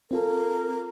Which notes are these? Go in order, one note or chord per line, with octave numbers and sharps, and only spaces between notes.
C4 F4 A4 A#4